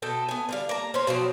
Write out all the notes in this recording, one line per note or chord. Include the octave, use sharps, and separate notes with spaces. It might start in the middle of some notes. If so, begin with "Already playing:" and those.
B2 A4 G5
B3 G#5
D3 G3 F5
A#3 A#5
C#4 C5
B2 F3 F#3 C4